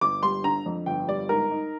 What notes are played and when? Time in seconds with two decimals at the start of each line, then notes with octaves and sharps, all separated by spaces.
0.01 G1 D6
0.22 G3 C6
0.43 D3 A#5
0.66 F2
0.86 G1 G5
1.08 G3 D5
1.29 G#2 A#4
1.51 D#4